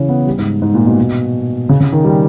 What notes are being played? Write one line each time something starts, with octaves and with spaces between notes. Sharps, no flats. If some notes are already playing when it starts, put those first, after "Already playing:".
Already playing: C#3 E3 C#4
B3
G3
G#2
G#2
A#2
B2
C#3
C#3
D#3
G3